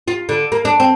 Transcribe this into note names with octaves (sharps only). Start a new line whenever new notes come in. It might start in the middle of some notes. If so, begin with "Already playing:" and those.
F4
D3
A#3
D4
C4